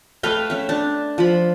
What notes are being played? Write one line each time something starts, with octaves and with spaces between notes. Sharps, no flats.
A3 B4 F5 G5
C#4 E5
D4
F3 B5